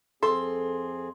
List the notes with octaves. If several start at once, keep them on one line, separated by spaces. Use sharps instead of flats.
F2 C4 G#4 A4 C6